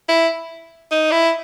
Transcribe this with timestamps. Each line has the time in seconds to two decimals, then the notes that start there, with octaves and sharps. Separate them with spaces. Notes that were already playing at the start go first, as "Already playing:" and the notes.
0.09 E4
0.91 D#4
1.11 E4